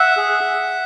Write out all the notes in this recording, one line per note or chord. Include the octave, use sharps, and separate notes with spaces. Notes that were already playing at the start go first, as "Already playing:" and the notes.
Already playing: E5 F#5
G#4